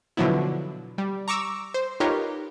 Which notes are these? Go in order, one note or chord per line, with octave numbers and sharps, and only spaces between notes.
B2 D3 F3 F#3 B3 E4
G3
A#5 C#6 D6 E6
C5
D#4 F4 G4 A#4 B4 C#5